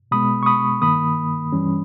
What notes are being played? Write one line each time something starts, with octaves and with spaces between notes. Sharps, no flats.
B2 G#3 B3 B5 D#6
C#6
B5 D#6
G2 D#3 A#3 B5 D#6
G2 E3 G3 C#4